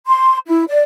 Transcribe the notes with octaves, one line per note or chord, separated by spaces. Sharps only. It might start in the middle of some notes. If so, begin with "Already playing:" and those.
C6
E4
D5